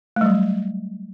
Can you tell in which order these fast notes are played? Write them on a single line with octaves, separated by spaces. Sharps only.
A3 G3 F#3